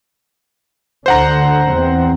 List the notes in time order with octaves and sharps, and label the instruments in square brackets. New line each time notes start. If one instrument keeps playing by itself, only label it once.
[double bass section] D2 D3 [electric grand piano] C5 F#5 A#5
[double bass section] E2 C4